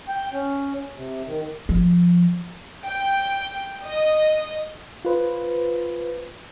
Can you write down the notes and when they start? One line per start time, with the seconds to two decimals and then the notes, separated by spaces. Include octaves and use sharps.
0.08 G5
0.33 C#4
0.96 C3
1.27 D#3
1.69 F3
2.86 G5
3.85 D#5
5.05 F4 B4 C5